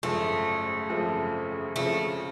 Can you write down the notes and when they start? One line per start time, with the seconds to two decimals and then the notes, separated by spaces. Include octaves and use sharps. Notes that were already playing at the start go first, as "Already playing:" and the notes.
0.03 G#1 F#2 C#3 F3 A3
0.89 G#1 F#2 C#3 F3
1.76 C#3 F3 A3